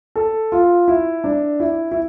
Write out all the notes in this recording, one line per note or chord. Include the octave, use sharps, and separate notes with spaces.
A4
F4
E4
D4
E4
E4